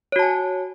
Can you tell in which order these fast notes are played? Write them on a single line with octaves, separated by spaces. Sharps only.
C#5 F#4 A5 G#5